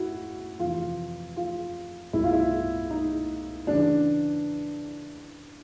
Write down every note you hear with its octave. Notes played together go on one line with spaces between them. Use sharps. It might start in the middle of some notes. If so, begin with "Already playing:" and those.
Already playing: E4 F#4
F2 C3 E3 F4
F4
C2 B2 E4
F4
E4
D#4
C#3 E3 D4